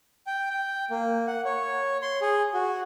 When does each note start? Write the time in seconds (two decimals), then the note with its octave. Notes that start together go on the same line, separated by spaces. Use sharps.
0.27 G5
0.50 G5
0.91 A#3
1.27 F#5
1.45 C#5
2.02 C6
2.21 G#4
2.54 F#4